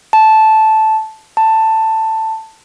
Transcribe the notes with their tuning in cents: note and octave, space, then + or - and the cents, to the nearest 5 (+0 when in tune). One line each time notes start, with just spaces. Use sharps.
A5 -10
A5 +10